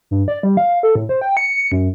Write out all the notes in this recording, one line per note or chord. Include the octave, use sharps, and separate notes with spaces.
G2
D5
G3
F5
A4
A2
C5
G5
C#7
F#2